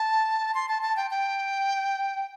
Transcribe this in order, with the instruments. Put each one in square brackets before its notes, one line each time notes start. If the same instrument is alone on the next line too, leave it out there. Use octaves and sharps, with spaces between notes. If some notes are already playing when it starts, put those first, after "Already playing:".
Already playing: [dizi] A5
C6
A5
A5
G5
G5